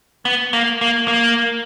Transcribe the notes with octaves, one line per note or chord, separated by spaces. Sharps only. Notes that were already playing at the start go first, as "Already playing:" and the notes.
B3
A#3
A#3
A#3